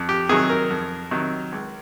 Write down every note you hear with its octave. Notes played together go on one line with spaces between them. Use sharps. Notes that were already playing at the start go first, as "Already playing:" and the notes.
Already playing: F2
G4
C3 D#3 F#3 G#4
A#4
F2
C3 D#3 F#3
C#2